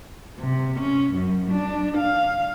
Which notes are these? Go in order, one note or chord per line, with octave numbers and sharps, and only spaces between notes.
C3
C#4
F#2
D4
F5